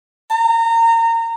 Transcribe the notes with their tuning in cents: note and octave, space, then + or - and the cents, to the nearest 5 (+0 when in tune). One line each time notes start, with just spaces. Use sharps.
A#5 -25